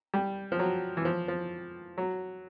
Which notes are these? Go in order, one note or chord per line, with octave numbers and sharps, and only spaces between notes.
G3
F3
F#3
E3
F3
F3
F#3